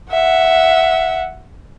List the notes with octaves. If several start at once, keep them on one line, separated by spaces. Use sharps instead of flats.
E5 F#5